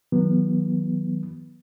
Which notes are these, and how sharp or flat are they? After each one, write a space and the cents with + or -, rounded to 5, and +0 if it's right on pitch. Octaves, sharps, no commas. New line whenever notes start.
D#3 +40 F#3 +0 B3 -25